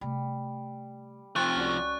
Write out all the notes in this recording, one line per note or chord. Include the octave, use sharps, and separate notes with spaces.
C3 G3 A3
C3 F3 C4 C#6 F#6 A6
C#2 C#4 F#4 D5